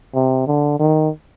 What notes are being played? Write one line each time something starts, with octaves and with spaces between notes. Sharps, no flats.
C3
D3
D#3